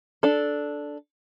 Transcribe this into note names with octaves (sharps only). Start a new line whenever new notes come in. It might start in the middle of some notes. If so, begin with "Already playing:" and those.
D4 A4